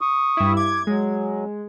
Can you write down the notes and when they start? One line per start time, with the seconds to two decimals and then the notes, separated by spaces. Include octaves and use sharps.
0.01 C#6 D#6
0.37 G2 E4
0.57 D6 G#6
0.87 F#3 G#3